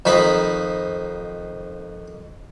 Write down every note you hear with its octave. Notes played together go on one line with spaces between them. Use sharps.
F2 D#3 D#4 B5